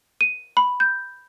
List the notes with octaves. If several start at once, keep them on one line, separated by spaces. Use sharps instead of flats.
D#7
B5
G6